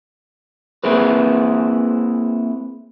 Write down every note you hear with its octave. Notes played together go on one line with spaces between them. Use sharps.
A#3 C4 E4 G#4 B4